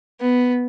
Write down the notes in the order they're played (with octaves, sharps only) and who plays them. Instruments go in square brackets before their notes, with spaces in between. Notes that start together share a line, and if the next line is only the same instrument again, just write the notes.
[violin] B3